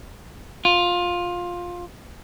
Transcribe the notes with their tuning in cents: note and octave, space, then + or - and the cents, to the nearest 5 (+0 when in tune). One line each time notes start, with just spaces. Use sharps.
F4 +15